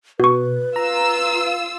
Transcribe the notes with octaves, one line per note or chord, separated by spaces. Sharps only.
B2 F#4 B4 C#6
F4 A#5 E6